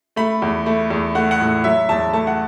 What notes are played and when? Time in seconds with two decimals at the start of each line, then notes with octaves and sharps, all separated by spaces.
0.16 A3 B5
0.42 E2
0.66 A3
0.90 E2
1.15 A3 F#5
1.31 F#5
1.40 A2
1.64 F#3 E5
1.89 E2 A5
2.13 A3 A5
2.27 F#5